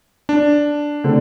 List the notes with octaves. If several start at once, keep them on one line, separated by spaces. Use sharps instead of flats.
D4
D3 A3 C4